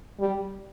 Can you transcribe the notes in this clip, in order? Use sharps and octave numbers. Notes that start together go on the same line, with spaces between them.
G3